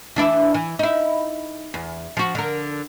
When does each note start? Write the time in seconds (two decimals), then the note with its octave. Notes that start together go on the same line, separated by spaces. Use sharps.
0.16 E3 D4 E4
0.54 E3
0.79 D#4 E4
1.74 E2
2.17 F3 F#4
2.35 D3 A#4